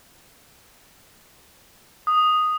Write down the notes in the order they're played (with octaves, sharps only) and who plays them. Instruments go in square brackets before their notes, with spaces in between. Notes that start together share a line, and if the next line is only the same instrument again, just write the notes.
[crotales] D#6